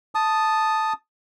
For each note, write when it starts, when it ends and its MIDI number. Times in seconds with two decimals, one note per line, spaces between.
0.15 0.93 81
0.15 0.93 87